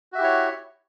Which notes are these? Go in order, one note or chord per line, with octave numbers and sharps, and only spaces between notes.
E4 F#4 G4 C#5 E5